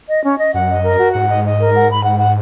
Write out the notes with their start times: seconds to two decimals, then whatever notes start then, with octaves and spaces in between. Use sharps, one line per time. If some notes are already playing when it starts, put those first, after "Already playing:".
0.09 D#5
0.24 C#4
0.38 D#5
0.54 F#2 F#5
0.69 D#5
0.84 A#4
0.99 F#4
1.14 G#2 F#5
1.29 D#5
1.44 D#5
1.60 A#4
1.75 F#5
1.90 B5
2.05 F#5
2.20 F#5